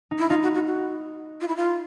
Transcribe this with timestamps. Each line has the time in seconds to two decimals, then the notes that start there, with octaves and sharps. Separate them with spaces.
0.11 D#4
0.19 E4
0.30 D#4 F4
0.43 F#4
0.54 F#4
0.67 F#4
1.41 F4
1.48 E4
1.56 F4